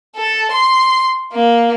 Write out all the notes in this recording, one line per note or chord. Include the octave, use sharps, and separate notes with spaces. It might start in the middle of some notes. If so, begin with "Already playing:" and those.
A4
C6
A#3